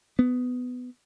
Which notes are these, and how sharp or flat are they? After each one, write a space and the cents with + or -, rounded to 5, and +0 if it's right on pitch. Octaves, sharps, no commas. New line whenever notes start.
B3 +15